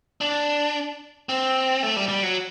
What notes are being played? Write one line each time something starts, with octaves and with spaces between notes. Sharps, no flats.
D4
C4
A3
G3
G3
F#3